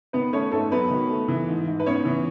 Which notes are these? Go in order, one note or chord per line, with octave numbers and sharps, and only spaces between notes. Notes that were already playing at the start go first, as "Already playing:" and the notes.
D#3 B3 B4
A3 C#4 C#5
G#2 A3 A4
F#3 B3 B4
D#3
A3
E3
G#2
G#2
B4
B3 C#4 C#5
E3